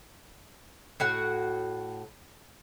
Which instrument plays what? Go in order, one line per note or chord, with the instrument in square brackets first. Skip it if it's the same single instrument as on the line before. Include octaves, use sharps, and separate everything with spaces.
[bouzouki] A2 F#4 F#5